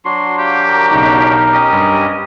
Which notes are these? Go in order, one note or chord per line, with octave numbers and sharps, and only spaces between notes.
F#3 D4 F#4 C6
G4 F5
A#4
B1 C#3 D#4
C#4 G4 D#5
G2